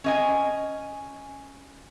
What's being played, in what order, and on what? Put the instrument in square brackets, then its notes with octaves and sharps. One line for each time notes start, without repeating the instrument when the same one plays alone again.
[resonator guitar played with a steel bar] C#4 D#5 G#5